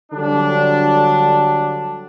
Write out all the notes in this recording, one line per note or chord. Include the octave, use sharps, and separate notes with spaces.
D3 F#3 G3 D4